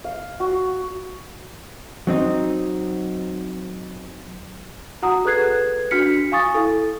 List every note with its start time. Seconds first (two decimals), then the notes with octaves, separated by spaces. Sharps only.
0.04 F5
0.40 F#4
2.07 F#3 C4 D#4
5.02 F#4 F#5 A#5 D#6
5.25 G#4 A4 B4 F#6 G#6 C7
5.91 D4 F#4 F6 B6 C#7
6.32 F5 G#5 C#6 D#6 A6
6.55 E4 A4